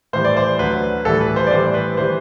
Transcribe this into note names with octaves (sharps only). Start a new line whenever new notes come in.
A2 E3 G3 C5
D5
C5
D2 D3 F#3 B4
A2 E3 G3 A4
B4
C5
D5
A2 E3 G3 C5
B4
E3 G3 C5